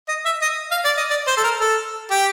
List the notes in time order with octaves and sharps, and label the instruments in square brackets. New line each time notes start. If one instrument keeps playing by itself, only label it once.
[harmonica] D#5
E5
D#5
F5
D5
D#5
D5
C5
A4
A#4
A4
G4